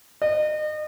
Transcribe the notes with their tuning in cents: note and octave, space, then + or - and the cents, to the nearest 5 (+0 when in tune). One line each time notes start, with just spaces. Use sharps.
D#5 -35